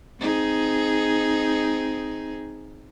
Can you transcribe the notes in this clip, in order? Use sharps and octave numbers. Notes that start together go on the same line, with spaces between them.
C4 D#4 G#4